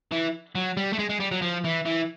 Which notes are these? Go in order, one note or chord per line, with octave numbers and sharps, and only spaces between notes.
E3
F#3
G3
A3
G#3
G#3
G3
F#3
F3
E3
E3